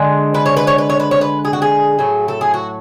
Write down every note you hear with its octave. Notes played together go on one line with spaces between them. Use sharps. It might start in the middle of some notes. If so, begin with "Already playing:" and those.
Already playing: D3 G#3
B4
C#5
B4
C#5
B4
C#5
B4
C#5
B4
G#4
F#4
G#4
A2 F#3 A3
A4
G#4
F#4